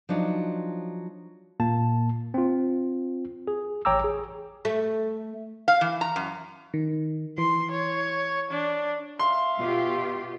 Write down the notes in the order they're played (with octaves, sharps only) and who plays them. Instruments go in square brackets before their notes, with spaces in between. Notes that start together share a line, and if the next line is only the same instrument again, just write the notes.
[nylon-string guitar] F3 F#3 D4 D#4
[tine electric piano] A#2 A#3 A5
C4 F4
G#4
A1 C#5 G5 A#5 D6 E6
G#4
[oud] A3
[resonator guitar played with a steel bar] F5
E3
A#5
F#2
[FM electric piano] D#3
[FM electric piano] E3 [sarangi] C6
[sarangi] C#5
D4
[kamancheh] E5 F5 [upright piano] C6
[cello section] B2 F4 G4